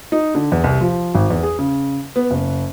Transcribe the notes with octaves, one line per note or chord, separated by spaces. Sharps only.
D#4
D3
E2
C2
F3
G#1
E2
G#4
C#3
B3
F#1